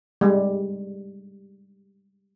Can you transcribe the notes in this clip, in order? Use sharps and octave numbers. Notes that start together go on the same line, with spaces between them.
G3 G#3